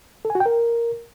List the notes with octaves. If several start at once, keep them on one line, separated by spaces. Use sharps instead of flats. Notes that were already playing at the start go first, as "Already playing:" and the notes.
A4
G#5
F#4
G5
A#4